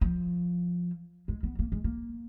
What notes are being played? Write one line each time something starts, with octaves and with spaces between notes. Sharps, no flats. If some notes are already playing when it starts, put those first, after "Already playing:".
F3
G#3
B3
A#3
G#3
A#3